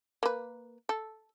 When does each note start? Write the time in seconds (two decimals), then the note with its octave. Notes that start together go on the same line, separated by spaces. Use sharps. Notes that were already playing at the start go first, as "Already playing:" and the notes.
0.23 A#3 B4
0.89 A4